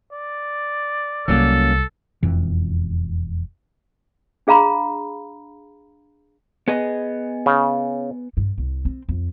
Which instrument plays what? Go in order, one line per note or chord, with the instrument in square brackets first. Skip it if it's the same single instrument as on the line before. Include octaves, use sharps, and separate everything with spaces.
[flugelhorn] D5
[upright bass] C2 [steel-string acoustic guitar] F#3 A#3 C#4 [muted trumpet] A4
[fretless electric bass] E1 F2 E3
[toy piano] D4 G#4 F5 A#5 B5
[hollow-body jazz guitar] B3 G#4 D#5
[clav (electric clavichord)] C#3
[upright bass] G2
C2
C4
F2